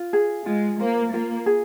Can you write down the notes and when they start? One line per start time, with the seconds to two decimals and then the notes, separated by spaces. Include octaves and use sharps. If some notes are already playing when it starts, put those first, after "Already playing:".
Already playing: F4
0.13 G#4
0.46 G#3 F4
0.79 A#3 C5
1.13 A#3 F4
1.46 G#4